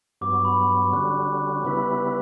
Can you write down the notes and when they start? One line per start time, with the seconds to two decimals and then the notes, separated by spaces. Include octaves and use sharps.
0.21 G2 F#3 B3 D6
0.34 C#6
0.45 B5
0.57 B5
0.70 B5
0.82 C#6
0.93 D3 G3 C#4 F#4
1.65 C#3 G3 B3 E4 B4